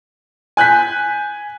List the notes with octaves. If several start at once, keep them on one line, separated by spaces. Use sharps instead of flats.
G#5 F#6 G6 B6